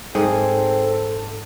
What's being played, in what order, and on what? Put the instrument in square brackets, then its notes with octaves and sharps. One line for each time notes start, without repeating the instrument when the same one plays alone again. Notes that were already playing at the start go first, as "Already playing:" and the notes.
[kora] G#2 G#4 [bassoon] C4 [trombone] A4